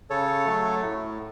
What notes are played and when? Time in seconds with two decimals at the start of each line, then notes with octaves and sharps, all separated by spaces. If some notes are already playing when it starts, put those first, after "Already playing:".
0.10 C#3 A4 C#5
0.46 F#3 A3
0.82 A2